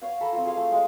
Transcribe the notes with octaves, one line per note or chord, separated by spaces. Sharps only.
C#5 F5 F#5
A4 A#5 B5 E6
C4 F4
G#4 C5 F5
A3
G#3 F5